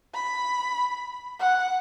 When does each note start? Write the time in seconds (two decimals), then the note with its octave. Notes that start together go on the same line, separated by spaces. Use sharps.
0.14 B5
1.39 F#5